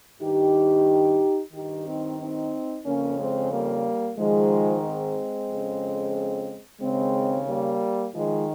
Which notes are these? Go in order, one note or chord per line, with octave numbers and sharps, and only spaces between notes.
G2 D#3 D#4 G4
G2 D#3 D#4 G4
C4 D#4
C4 D#4
F2 C#3 A#3 C#4
G#3 C4
G3 A#3
G#2 D#3 F3 G#3
G#3 C4
F2 C#3
D#2 C#3 G#3 C4
G3 A#3
G#2 D#3 F3 G#3